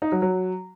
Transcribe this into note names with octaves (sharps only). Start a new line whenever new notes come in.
D#4
F#3
F#3